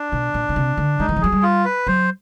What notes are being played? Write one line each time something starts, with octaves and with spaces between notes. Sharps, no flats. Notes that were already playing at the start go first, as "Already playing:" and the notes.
Already playing: D4
B2
A#2
B2
C3
D3
G#3 D#4
E3
F3
F#3 G#4
G3
F4
B4
F#3 C5